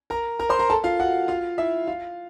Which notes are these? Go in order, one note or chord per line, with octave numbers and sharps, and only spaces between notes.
A#4 A#5
A#4 A#5
C5 C6
A#4 A#5
A4 A5
F4 F5
F#4 F#5
F4 F5
E4 E5
F4 F5